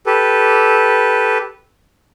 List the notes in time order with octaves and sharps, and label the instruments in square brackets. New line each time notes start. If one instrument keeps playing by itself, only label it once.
[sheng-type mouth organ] G4 A4 B4